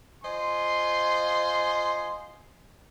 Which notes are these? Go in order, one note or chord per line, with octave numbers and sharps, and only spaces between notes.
F4 C5 D#5 G#5 C6